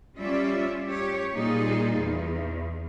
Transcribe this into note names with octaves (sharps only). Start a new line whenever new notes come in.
G3 C#4 F4 D5 E5
G4 C#5
A#2 G3 D#4 F4 G#4
E2